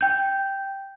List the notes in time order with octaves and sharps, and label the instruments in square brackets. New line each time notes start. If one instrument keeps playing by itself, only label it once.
[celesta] G5 G6